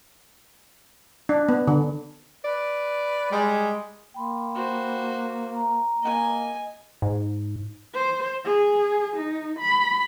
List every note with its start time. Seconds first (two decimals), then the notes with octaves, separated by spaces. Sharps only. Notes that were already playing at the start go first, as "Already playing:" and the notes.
1.29 D4
1.49 B3
1.67 D3
2.44 B4 D5
3.32 G3 G#3
4.14 A#3 G5 B5 C6
4.55 F#4 C5
5.55 A#5
6.03 A#3 D#5 G#5
7.02 G#2
7.94 C5
8.45 G#4
9.17 D#4
9.60 B5